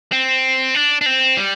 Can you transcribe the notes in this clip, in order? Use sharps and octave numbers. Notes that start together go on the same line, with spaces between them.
C4
D4
D4
C4
G3